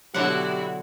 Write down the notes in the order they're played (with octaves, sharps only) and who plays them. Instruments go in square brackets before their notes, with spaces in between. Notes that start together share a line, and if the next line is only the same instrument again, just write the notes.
[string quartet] B2 E4 F#4 [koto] D3 F#5 [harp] F#3 D4 [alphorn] G4